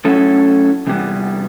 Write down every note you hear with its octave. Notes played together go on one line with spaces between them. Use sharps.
F#3 A3 C#4 E4 A4
E2 C3 E3 G3 B3